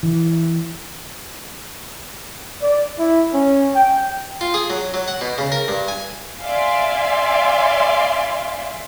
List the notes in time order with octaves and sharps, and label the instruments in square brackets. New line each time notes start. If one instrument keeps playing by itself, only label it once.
[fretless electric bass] E3
[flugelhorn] D5
E4
C#4
G5
[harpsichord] F4
G#4
F#3
F#3
F#5
B2
C#3
A#4
G2
G#5
[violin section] D5 E5 F5 G#5 C6